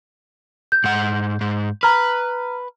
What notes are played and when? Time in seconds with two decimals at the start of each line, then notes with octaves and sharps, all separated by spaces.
0.72 G6
0.84 G#2 F#5
1.41 G#2
1.83 B4 A#5 F6